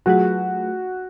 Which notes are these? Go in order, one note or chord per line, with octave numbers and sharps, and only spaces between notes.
F#3 A3 F4 F#4 G#4 B4